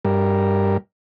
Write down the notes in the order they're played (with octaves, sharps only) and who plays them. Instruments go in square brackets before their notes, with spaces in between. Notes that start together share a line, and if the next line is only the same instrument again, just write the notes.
[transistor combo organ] G2 G3 A#4